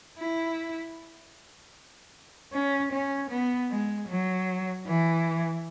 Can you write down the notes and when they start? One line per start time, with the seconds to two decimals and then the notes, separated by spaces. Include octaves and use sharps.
0.19 E4
2.53 C#4
2.92 C#4
3.30 B3
3.70 G#3
4.09 F#3
4.87 E3